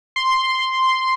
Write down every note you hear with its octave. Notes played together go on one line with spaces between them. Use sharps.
C6